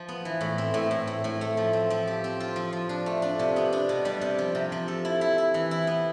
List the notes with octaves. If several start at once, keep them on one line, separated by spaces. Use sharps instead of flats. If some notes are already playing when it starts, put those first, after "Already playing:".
Already playing: F3
B3
E3
A2
C4
A2
A2
A2
A2
A3
F3
C4
F3
G4
C4
F4
F3
F3
D4
A3
D4
C3
B3
D4
B2
G3
C3
F3
C3
F3
A4
E4
E4
E4
E3
E4
B3